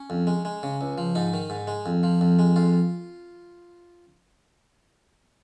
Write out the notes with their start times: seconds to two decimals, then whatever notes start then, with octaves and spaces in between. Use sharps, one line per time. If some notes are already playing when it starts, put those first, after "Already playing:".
Already playing: C#4
0.10 F2
0.27 G#3
0.45 G#3
0.63 C#3
0.81 C#2
0.98 F3
1.15 G#2 D#4
1.34 D#3
1.50 G#2
1.67 G#3
1.86 F2
2.03 F3
2.21 F2
2.39 G#3
2.56 F2 F4